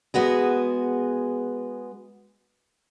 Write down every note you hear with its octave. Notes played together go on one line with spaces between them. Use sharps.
G#3 B3 F#4 G#4